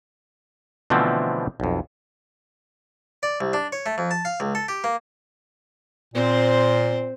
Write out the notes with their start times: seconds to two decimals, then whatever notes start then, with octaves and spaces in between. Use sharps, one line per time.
0.90 B2 D3 E3 F3 A3 C4
1.60 B1 F2
3.23 D5
3.41 C2
3.53 D4
3.72 C#5
3.86 A3
3.98 F2
4.11 A5
4.25 F5
4.40 C#2
4.55 A4
4.68 G4
4.84 A#3
6.14 A#2 C4 C5